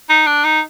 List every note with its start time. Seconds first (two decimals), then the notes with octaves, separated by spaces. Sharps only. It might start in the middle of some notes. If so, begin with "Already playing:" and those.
0.10 D#4
0.27 D4
0.45 D#4